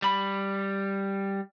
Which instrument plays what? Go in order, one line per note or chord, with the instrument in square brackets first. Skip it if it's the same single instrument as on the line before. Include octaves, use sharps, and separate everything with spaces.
[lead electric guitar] G3 B5